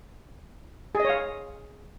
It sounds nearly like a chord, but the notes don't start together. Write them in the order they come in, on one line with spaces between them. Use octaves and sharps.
G#4 D#5 C#5 F5